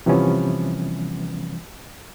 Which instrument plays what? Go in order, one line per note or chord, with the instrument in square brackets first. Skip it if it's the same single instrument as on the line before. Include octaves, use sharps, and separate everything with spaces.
[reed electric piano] C3 E3 F3 G3 B3 C#4